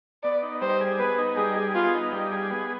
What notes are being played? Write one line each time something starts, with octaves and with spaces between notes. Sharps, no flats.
B3 D5
D#4
G3 C5
G#4
B3 B4
D#4
G3 G#4
G#4
B3 F4
D#4
G3
G#4
B3